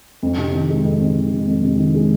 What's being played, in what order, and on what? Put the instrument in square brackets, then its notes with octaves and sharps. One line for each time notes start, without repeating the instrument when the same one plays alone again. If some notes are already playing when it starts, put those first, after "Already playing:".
[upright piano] F2
C3
D#3
G#3
F2
C3
D#3
G#3
F2
C3
D#3
G#3